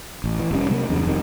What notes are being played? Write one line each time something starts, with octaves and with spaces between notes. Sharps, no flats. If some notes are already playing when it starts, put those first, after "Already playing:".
A1
E3
F1 G3 C#4
C3 F#3 G#3 A#3
E2 G2 C#3
F1 F2 D#3 G3